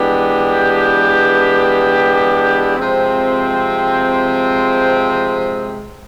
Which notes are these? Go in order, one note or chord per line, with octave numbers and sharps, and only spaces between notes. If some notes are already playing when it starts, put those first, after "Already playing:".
Already playing: E3 G#3 B3 D4 G4
C3 F3 G#3 C4